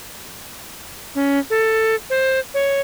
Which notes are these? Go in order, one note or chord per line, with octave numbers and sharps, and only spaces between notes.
C#4
A4
C5
C#5